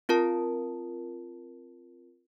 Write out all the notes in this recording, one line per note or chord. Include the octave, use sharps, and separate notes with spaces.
C4 F4 A#4 A5